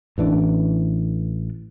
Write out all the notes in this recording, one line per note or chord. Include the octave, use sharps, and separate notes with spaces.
A1 E3 D4